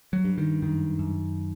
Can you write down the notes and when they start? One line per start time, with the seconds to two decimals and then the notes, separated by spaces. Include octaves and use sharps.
0.13 F#3
0.25 G2
0.38 D#3
0.62 F#2 D#3
0.99 F#2